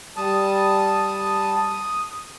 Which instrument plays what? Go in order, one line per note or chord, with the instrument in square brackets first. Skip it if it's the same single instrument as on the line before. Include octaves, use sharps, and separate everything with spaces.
[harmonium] G3 A5 [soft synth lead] D#6